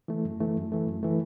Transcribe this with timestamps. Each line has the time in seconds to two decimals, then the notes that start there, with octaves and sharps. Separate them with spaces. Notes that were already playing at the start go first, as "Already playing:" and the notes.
0.08 E3 A3
0.25 F#2
0.40 E3 A3
0.56 F#2
0.72 E3 A3
0.87 F#2
1.03 E3 A3